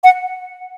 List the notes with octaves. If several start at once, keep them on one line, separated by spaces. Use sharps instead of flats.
F#5